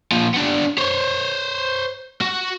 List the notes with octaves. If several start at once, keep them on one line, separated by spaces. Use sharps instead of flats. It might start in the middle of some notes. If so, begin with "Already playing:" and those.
A#2 F3
B3 D4
C5 C#5
F#4